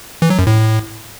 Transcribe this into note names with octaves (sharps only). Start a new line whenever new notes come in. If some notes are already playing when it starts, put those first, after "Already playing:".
E3
F#3
F#2
A2